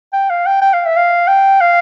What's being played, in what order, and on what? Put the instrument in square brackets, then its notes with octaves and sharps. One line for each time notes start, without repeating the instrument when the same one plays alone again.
[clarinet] G5
F5
G5
G5
F5
E5
F5
G5
F5